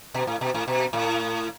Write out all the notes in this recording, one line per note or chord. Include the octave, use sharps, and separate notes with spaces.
B2
A2
B2
A2
B2
A2